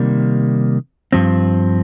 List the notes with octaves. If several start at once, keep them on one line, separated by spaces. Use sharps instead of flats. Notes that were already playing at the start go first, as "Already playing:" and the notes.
Already playing: C3 D#3 G3 A#3
G2 F3 C4